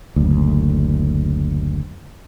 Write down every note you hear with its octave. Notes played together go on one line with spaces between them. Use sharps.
F#1 D2